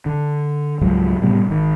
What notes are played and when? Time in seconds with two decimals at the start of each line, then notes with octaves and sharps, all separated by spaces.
0.06 D3
0.81 C#2 G#2 F3 F#3
1.22 A2 C3 G3 B3
1.48 G#1 D#3